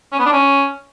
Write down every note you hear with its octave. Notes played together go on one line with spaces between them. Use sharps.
C#4
B3
D4
C#4